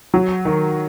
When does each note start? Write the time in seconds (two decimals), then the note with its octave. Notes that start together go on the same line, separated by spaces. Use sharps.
0.14 F#3
0.45 D#3